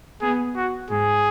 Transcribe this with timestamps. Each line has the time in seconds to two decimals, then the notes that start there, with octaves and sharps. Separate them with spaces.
0.21 B3 G#4
0.56 F#4
0.90 G#2 G#4